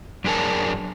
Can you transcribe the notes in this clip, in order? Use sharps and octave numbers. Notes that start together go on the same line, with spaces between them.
F#2 D4 G#4 A#4 A5